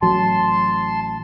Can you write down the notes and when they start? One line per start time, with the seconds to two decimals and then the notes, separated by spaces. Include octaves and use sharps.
0.02 A1 F#3 A5 C6